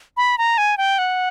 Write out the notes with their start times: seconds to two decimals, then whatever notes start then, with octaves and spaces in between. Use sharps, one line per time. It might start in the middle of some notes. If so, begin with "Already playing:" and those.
0.17 B5
0.38 A#5
0.58 G#5
0.78 G5
0.98 F#5